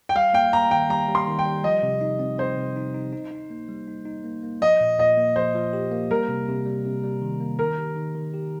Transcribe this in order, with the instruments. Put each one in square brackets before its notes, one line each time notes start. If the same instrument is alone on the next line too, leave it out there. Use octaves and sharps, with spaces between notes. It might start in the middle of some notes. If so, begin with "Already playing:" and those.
[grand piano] G5
[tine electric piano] G3 [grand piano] F5
[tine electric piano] A#3 [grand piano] G5
[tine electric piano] A#3 [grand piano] A#5
[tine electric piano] D#3 [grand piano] G5
[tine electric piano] G3 [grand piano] A#5
[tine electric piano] G3
[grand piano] C6
[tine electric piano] D#3
[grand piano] G5
[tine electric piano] G3
[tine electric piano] F3 [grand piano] D#5
[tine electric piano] C3
D#4
C4
[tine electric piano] C4 [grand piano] C5
[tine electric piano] C3
D#4
D#4
D#4
D#4
A#3
G3
D#4
D#4
A#3
A#3
[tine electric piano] F3 [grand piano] D#5
[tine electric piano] A#2
[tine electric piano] A#2 [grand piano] D#5
[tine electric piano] A#3
[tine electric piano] F3 [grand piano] C5
[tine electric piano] F3
G4
A#3
[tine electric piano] G3 [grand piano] A#4
[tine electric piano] C3
C3
G3
C3
G3
D#3
A#3
[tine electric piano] D#3 [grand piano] A#4
[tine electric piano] G4
D#3
D#3
G4